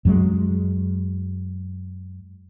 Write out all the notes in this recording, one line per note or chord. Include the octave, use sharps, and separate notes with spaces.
F#2 F#3 G#3